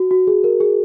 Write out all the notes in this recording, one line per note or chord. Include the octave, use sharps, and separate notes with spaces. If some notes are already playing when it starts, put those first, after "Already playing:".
Already playing: F#4
F#4
G#4
A#4
G#4